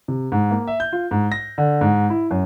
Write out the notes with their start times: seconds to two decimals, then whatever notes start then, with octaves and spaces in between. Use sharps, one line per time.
0.08 C3
0.32 G#2
0.51 A#3
0.67 E5
0.80 G6
0.93 F4
1.11 G#2
1.32 A#6
1.58 D3
1.81 G#2
2.10 E4
2.31 F#2